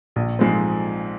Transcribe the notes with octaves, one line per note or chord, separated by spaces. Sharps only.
A#1
G#2 F3 G#3 C4